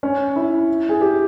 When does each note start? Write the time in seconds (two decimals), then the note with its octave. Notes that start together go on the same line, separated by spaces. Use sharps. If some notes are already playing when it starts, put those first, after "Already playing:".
0.03 C#4
0.36 E4
0.89 G#4
1.01 G4